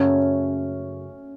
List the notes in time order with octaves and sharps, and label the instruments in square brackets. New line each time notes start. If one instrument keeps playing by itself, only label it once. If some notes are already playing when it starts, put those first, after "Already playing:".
Already playing: [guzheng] F#2 C#3 A3 [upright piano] C#4